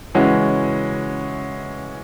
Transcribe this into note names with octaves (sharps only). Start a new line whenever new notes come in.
C#3 E3 G#3 C#4 F#4